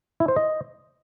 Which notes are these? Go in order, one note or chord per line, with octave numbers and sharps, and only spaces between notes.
E4
C5
D#5